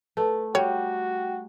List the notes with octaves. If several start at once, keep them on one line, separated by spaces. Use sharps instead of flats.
A3 A4 B4 A5
G3 F#4 C#5 G5